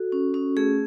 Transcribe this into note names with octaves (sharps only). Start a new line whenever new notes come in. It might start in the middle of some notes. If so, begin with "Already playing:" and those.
Already playing: F#4 A4
C#4
C#4
A3 G#4